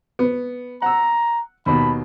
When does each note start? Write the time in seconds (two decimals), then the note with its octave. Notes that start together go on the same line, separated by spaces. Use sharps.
0.19 B3
0.82 F#5 A#5 E6
1.66 D#2 B2 B5